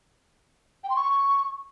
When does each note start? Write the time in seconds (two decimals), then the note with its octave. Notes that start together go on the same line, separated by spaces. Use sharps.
0.84 G5
0.90 C6
0.96 C#6